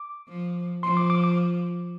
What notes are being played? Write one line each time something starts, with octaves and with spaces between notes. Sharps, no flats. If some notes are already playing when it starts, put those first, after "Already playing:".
Already playing: D6
F3
F3 C6
D6
D6
D6